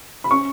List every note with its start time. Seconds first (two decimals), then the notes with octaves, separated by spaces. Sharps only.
0.24 B5
0.30 C#4 C#6